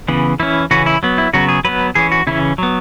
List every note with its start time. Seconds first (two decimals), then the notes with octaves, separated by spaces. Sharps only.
0.08 C#3 E3 B3
0.40 E3 C#4 E4
0.71 C#3 E3 C#4 F#4
0.86 E4
1.03 F#3 B3
1.18 E4
1.33 C#3 F#3 B3 F#4
1.49 G#4
1.65 F#3 B3 B4
1.95 E3 C#4 G#4
2.12 F#4
2.27 C#3 E3 C#4 E4
2.58 F#3 B3